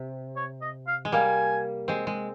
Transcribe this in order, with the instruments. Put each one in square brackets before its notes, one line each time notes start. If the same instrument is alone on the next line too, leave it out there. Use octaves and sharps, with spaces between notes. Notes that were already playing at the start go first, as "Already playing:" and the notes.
Already playing: [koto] C3
[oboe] C#5
D#5
F5
[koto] G#3
[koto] G3 A#3 [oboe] G#5
[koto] G#3 C4
G#3